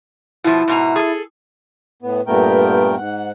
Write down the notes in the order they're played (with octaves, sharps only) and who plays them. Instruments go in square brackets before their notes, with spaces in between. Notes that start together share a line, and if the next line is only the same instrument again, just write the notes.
[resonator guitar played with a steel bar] B2 F3 [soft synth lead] E4
[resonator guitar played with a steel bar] G#2 B2 A#5
G#4 A4
[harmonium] A2 B3
G2 A#2 A3 B3 A#4 G5
G#2 F#5